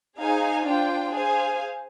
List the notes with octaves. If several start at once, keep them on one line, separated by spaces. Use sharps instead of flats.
D#4 G#4 C5 F5 G#5
D4 F4 C5 G5
G#4 C5 F5 G#5